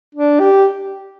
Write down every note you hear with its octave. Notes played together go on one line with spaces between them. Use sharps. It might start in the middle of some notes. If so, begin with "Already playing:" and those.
D4
G4